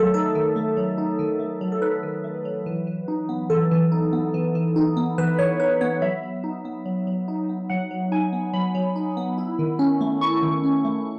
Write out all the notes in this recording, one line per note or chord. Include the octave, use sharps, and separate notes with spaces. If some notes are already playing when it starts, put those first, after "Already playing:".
Already playing: D#3 F#3 A3 A4 E5
D#4 A4
D#3
A3
F#3
D#4
D#3
A3
F#3
A4
D#4 B4
D#3
A3
F#3
E3
E3
D#4
B3
E3 A4
E3
D#4
B3
E3
E3
D#4
B3
E3 B4
E3 C#5
D#4 B4
B3 C#5
F#3 E5
F#3
D#4
B3
F#3
F#3
D#4
B3
F#3 F#5
F#3
D#4 G#5
B3
F#3 B5
F#3
D#4
B3
E4
D#3
C#4
A3
E4 C#6
D#3
C#4
A3